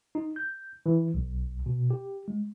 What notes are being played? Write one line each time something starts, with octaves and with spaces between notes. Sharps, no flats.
D#4
G6
E3
B1
B2
G4
G#3